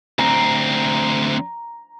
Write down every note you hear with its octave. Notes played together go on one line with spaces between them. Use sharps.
D2 C4 A#5